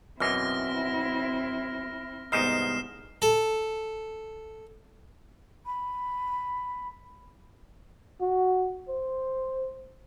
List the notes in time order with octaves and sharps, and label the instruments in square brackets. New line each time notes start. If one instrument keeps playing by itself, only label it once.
[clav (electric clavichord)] F#2 B2 E3 [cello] C4 E4 [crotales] F6 A#6
[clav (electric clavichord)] C2 G#2 D#4 [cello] B3 [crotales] F6 C7 E7
[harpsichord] A4
[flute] B5
[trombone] F#4
C5